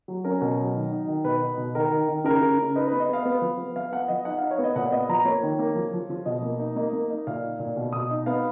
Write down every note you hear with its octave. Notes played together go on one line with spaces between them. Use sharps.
F#3
C#4 A#4
B2
F#3
D#3
D#4
D#3
B2 B4
D#4
B2
D#3 A#4
D#3
D#3
C#3 A#4
C#3
C#3
D#4 B4
B3 B4
D#5
B3 F5
B3
F3
B3
F3 F5
B3 F#5
F3 D#5
D#4 F#5
D#4 F5
C#5
B3
D#5
A#2 F#5
B3 D#5
F3 A#5
A#3 C#5
D#3
A#3
F3
F3
F3
B2 D#5
A#3
D#4
A#3 D#5
A#3
D#4
A#2 F5
D#4
A#2
B2
B2 D#6
D#4
B3 F5